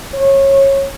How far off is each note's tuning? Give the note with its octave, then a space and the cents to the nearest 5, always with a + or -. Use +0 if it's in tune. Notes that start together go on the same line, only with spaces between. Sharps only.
C#5 -20